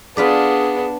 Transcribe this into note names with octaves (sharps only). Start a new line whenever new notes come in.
B3 D4 F4 G#4 B4 D5